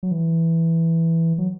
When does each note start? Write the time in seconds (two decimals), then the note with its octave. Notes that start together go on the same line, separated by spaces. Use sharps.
0.03 F#3
0.11 E3
1.38 F#3